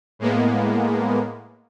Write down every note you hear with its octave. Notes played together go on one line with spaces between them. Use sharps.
A2 G#3 A#3 B3